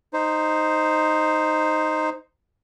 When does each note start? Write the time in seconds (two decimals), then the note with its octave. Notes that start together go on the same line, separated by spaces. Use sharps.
0.13 D#4 C5